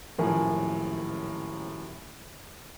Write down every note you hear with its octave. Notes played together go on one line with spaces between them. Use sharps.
D#1 F#2 A2 F3 A#4 G#5